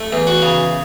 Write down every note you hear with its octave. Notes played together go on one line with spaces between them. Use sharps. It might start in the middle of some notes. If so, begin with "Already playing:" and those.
Already playing: A3
E2
F#4
C#3